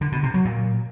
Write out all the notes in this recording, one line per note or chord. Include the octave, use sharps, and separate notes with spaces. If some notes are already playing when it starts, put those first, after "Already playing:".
D3
B2
C3
F#3
A#2